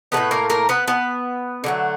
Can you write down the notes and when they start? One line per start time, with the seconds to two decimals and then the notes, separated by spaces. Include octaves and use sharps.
0.12 F#3 A3 B3 B4
0.17 A2
0.31 A#3 A#4
0.50 A#3 A#4
0.69 B3 B4
0.88 B3 B4
1.64 D3 F#3 A3